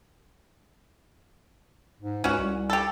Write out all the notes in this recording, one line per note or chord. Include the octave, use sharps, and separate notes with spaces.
G#2
C#2 C#4 F#4
C2
G4 A4